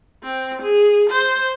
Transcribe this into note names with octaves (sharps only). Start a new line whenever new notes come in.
C4
G#4
C5